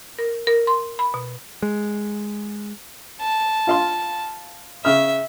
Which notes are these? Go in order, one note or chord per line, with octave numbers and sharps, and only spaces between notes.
A#4
A#4
C6
B5
B2
G#3
A5
F4 F5 C6
C#3 E5 F6